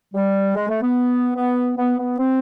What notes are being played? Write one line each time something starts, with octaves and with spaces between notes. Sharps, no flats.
G3
G#3
A3
B3
B3
B3
B3
C4